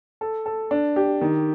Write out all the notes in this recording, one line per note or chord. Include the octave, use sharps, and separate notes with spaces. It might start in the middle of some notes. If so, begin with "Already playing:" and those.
A4
A4
D4
G4
D#3